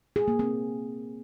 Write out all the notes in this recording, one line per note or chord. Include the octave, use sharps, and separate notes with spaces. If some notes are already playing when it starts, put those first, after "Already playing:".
G#4
A#3
C4